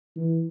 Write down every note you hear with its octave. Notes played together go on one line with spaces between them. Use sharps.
E3